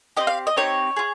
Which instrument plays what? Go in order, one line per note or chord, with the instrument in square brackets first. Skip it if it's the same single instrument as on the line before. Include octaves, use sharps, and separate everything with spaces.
[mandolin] C4 D#4 G4 D#5
F5
D#5
C4 D#4 G4 C#5
F4 G#4